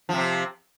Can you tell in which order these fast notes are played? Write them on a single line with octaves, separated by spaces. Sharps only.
F3 C3 C4